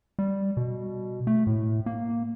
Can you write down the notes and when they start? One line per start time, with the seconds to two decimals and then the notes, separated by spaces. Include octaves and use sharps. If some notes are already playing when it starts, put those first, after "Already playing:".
0.19 G3
0.57 B2
1.27 A3
1.47 A2
1.86 A#3